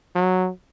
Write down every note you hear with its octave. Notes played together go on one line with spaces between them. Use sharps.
F#3